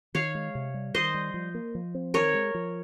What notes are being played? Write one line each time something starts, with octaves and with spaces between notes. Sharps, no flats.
D#3 C#5 F5
G#3
C3
G3
D#3 C5 D#5
G3
F3
A#3
F3
C4
D#3 A#4 C#5
G#3
F3